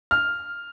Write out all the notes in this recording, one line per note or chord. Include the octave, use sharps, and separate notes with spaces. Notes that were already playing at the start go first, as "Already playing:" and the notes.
F6